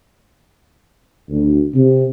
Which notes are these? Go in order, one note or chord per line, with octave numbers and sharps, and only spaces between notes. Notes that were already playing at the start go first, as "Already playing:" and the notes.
D2
C3